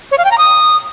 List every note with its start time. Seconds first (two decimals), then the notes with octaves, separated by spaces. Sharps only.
0.11 C#5
0.18 F5
0.25 G5
0.31 A#5
0.38 D#6